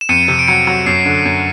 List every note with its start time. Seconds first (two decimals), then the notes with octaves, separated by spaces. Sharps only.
0.01 E7
0.09 F2 C#7 D#7
0.28 C3
0.39 D7
0.48 F#3 C#7 D#7
0.67 F#3
0.86 F#2 C7
1.05 D3
1.25 F#2